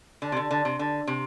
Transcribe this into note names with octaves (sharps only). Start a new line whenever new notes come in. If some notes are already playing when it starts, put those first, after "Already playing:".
D3
C3
D3
D3
C3
D3
C3